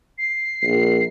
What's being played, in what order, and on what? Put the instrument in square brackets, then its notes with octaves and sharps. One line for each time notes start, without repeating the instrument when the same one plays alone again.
[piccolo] C7
[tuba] A#1